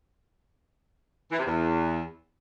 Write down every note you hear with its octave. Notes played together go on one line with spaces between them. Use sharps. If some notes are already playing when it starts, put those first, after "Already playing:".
E3
C3
E2